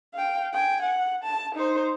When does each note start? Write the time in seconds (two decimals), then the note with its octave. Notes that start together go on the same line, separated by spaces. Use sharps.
0.14 F5 G5
0.53 G5 G#5
0.82 F#5
1.24 A5
1.55 D#4 C5